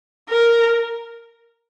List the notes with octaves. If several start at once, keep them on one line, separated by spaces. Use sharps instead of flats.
A#4